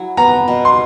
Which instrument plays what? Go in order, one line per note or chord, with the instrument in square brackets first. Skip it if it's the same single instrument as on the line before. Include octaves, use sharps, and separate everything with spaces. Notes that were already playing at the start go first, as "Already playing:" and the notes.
Already playing: [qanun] F#3 E4
[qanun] B3 [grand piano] A#5
[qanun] B2
[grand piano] C6